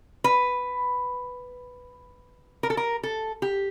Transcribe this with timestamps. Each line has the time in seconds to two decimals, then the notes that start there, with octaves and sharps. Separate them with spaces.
0.24 B4
2.63 A#4
2.70 A4
2.77 A#4
3.03 A4
3.42 G4